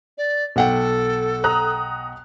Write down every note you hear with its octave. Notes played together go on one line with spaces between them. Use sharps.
D5
B1 A4 F#5 G5
A#5 D#6 F#6